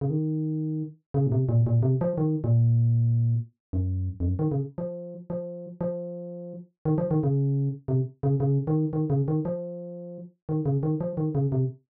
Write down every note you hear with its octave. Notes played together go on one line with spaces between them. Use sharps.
C#3
D#3
C#3
A#2
C3
A#2
A#2
C3
F3
D#3
A#2
F#2
F2
F#2
D#3
C#3
F3
F3
F3
D#3
F3
D#3
C#3
C3
C#3
C#3
D#3
D#3
C#3
D#3
F3
D#3
C#3
D#3
F3
D#3
C#3
C3